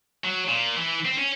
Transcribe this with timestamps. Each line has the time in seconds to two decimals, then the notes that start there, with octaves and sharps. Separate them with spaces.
0.24 F#3
0.48 A#2
0.76 E3
1.05 C4
1.18 C#4